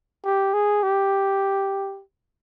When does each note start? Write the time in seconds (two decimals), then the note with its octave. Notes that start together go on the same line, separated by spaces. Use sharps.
0.25 G4
0.54 G#4
0.83 G4